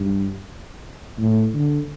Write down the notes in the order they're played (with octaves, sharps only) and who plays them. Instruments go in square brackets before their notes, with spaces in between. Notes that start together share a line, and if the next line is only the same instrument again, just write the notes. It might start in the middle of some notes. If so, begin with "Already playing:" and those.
Already playing: [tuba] G2
A2
D3